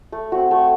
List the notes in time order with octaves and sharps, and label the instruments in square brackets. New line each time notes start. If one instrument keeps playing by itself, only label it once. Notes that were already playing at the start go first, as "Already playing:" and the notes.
[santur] A3
C4 F#4
A3